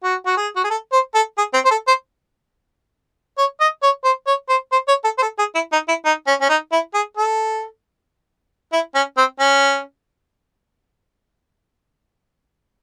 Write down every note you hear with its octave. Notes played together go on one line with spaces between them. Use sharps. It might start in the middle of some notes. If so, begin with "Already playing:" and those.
F#4
F#4
G#4
F#4
G#4
A4
C5
A4
G#4
C4
C5
A4
C5
C#5
D#5
C#5
C5
C#5
C5
C5
C#5
A4
C5
A4
G#4
E4
D#4
E4
D#4
C#4
C#4
D#4
E4
G#4
A4
E4
C#4
C4
C#4